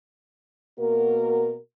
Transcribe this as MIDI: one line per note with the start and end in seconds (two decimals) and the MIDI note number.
0.79 1.56 47
0.79 1.56 58
0.79 1.56 66
0.79 1.56 70